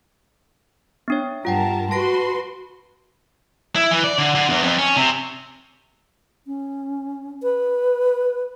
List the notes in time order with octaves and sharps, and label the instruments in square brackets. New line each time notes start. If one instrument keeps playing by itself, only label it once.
[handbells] B3 D4 C#5
[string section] G2 A#4 A5 [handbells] F4 F#5 G5
[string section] F#4 B4 C6 [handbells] A5 A#6 D7
[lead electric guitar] E4
E3
D5
D3
D3
E2
F2
C#4
C3
[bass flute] C#4
B4